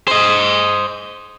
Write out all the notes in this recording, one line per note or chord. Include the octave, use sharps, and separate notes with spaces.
C5 D#5